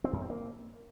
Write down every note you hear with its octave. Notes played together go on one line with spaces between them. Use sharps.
C4
F#2
C4
A#3